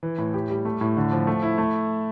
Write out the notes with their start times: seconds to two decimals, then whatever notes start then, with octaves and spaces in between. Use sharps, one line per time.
0.03 E3
0.18 A2
0.34 G4
0.50 G3
0.65 A3
0.81 A2
0.97 D3
1.12 F3
1.27 A3
1.43 E4
1.58 A3